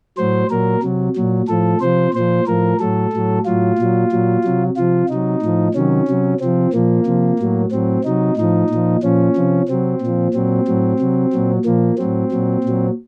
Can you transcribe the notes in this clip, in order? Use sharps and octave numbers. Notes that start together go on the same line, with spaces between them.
A2 F#3 C5
A#2 F#3 A#4
C3 F#3
A#2 F#3
A2 F3 A4
C3 F3 C5
A#2 F3 C5
A2 F3 A#4
A2 F#3 A4
A2 F#3
A2 F#3 F4
A#2 F#3
A#2 F#3
C3 F#3
C3 F3 F4
C3 F#3 D#4
A2 F3
C3 D#3 F#3 C#4
C3 F#3
C3 F3 C4
A#2 F3 A#3
C3 F3
A2 F#3
A2 F#3 C4
C3 F#3 D#4
A2 F3 D#4
A#2 F3
A#2 F3 C#4
C3 F3
C3 F#3 C4
A#2 F3
A#2 F#3 C4
A2 F#3
C3 F#3
A#2 F#3
A#2 F3 A#3
A2 F#3 C4
A#2 F#3
A#2 F#3